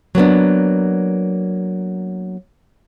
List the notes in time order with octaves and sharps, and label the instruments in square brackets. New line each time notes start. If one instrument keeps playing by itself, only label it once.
[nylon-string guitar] F#3 A#3 B3 D4